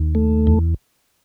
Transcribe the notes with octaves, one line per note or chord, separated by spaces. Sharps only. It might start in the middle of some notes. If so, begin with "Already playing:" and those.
Already playing: D#2
A3
E2